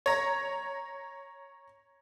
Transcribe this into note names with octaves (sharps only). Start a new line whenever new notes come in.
C#5 A#5